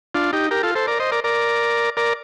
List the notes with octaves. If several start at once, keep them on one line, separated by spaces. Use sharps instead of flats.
D4 F4
D#4 G4
G4 A#4
F4 A4
A4 C5
A#4 D5
C5 D#5
A#4 D5
A#4 D5
A#4 D5